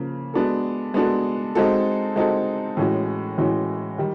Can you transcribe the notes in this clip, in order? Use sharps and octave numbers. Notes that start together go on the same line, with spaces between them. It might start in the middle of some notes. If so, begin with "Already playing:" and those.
Already playing: C#3 F3 A#3
G#3 B3 D4 F#4 A4
G#3 B3 D4 F#4 A4
G#3 C4 D#4 F#4 A4
G#3 C4 D#4 F#4 A4
A2 E3 G#3 C#4 F#4
A2 E3 G#3 C#4 F#4
D#3 G3